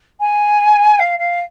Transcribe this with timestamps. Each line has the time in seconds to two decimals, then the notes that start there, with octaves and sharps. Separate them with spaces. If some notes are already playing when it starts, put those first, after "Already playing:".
0.20 G#5
0.99 F5
1.18 F5